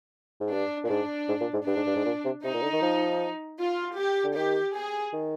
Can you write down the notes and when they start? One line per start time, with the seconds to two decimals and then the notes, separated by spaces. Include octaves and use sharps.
0.41 G#2
0.52 G2 D4
0.84 A#2
0.90 G#2 D4
1.29 G#2
1.41 A#2
1.54 G#2
1.67 G2 D4
1.76 G#2
1.87 G2
1.96 G#2
2.06 A#2
2.25 C3
2.44 C3 D#4
2.54 A#2
2.62 D3
2.73 D#3
2.82 F3
3.59 F4
3.97 G4
4.24 D3
4.35 D#3 G4
4.75 G#4
5.13 D#3